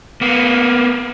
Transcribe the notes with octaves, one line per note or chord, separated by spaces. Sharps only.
A#3 B3